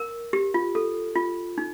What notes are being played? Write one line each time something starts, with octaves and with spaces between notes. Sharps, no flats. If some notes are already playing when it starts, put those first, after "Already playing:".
Already playing: A#4
G4
F4
A4
F4
D#4